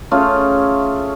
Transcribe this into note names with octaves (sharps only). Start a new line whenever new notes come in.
A3 C#4 F4 G#4